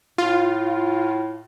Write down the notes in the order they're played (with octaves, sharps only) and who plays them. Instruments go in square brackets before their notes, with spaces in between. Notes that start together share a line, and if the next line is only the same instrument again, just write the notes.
[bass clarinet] A2 [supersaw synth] F4